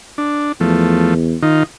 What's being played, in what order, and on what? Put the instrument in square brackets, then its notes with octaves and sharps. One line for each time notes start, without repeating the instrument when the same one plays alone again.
[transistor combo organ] D4
[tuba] E2 [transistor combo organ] F3 A3
[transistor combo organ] D#3 D#4 F4